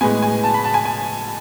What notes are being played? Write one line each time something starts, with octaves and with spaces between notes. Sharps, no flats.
A2 G#3 B3 G#5
G#5
A5
B5
A5
G#5
G#5